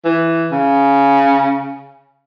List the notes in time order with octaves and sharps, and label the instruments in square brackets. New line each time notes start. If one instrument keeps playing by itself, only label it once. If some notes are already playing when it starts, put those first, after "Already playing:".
[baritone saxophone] E3
C#3